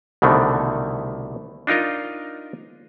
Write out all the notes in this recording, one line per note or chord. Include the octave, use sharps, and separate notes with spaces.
C2 B2 D3 D#3 A3
D4 D#4 F4 A#4 D#5